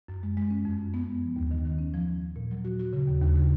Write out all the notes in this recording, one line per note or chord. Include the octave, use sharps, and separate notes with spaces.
F#2
G#3
G#3
C#4
F2
F#2
B3
G#3
F3
D#2
D#3
D#3
C#4
F3
F3
F3
A#2
F#3
F#4
F#4
C#3
D#2
D#2
C#3